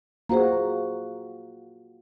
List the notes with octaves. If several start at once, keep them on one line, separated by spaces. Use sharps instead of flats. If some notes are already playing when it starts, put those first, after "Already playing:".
A#3 F4 F#4 G#4 C5 A#5